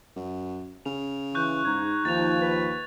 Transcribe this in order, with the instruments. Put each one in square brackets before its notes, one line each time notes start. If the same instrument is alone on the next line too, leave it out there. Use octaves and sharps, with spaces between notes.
[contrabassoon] F#2
[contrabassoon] C#3 [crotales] F7
[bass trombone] E3 [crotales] C#6 F#6 G6
[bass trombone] G#2 [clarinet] D#4 [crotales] G#6
[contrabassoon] D#2 [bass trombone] F3 [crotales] A6 F7
[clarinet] B4